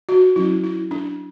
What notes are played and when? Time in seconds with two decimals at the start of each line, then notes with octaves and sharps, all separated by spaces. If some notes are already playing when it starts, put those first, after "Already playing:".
0.09 F#4
0.36 F#3 C#4 E4
0.64 E4
0.91 D4